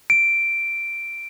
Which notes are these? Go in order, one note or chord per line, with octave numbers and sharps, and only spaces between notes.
D7